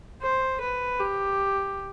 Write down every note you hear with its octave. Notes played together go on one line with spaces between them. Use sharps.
C5
B4
G4